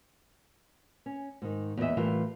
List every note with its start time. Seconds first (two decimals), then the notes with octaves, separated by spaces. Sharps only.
1.06 C#4
1.42 G#2 D#3
1.77 E2 A#2 G#3 E4 D#5 E5
1.97 A2 E3 G3 F4 A#4